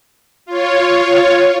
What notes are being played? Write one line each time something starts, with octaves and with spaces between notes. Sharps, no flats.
F4 C#5